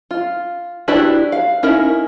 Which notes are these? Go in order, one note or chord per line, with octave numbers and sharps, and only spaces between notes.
F4
D4 E4 F#4 G4 B4
F5
C#4 D#4 E4 A#4